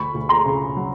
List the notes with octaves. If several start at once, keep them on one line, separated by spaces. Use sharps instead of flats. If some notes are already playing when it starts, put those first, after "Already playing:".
Already playing: D2 B5 C#6
D2
A#5 C6
C#3
F#3